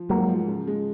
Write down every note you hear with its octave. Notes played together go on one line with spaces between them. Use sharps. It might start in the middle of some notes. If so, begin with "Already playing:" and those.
Already playing: F3
G#2 F#3 A#3
F3
C#3
G#3